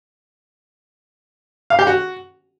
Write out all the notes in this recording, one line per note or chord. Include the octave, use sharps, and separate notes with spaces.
F5
G4
F#4